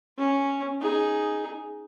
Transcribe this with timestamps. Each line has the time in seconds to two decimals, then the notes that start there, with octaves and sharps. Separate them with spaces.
0.18 C#4
0.81 D#4 G#4